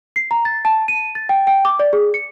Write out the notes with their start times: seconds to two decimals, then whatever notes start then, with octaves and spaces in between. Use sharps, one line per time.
0.16 C7
0.31 A#5
0.45 A6
0.65 A5
0.88 D#7
1.15 A6
1.29 G5
1.47 G5
1.65 D6
1.79 D5
1.93 G#4
2.14 C#7